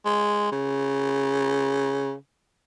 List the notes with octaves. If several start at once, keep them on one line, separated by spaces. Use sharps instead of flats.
G#3
C#3